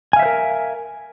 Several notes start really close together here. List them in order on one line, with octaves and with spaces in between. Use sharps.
G#5 F5 E5 C5 A#4